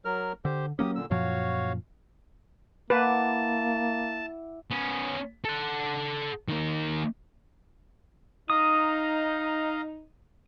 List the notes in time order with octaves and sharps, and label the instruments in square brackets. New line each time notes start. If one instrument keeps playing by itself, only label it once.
[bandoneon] F#3 A#4 F6
[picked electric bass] D3 [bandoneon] G4 C5
[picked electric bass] F#3 A#3 C#4 [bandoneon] G4 D#6
[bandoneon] A#2 D3 E6
[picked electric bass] F#2 A#2 F3 [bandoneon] F#4 C#5 F5
[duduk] A#3 [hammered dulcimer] E4 F#5 D6 [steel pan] B4 [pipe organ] A5
[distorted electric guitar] B3 C#4
A4 F#5
D#3 A#3
[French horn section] D#4 [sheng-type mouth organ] D#5 F5 A#5 [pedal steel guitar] D#6